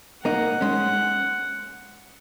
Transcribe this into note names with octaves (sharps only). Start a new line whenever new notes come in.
A#3 D#4 F#5
G#3 C#4